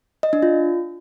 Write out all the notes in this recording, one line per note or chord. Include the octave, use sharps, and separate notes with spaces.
D#5
D4
F4